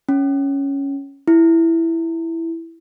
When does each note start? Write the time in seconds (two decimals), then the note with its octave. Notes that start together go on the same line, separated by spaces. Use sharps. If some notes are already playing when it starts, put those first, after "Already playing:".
0.09 C#4
1.28 E4